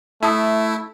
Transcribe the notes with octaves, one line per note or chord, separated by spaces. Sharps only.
A3 E4 A5 D#6